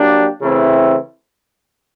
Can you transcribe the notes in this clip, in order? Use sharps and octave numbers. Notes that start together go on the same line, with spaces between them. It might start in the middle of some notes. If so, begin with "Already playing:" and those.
Already playing: F#3 A#3 D4 G4
C#3 E3 A3 C4 E4